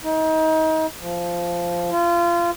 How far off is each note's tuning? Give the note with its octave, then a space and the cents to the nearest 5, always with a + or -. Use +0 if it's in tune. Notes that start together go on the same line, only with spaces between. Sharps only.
D#4 +30
F3 -10
F4 -25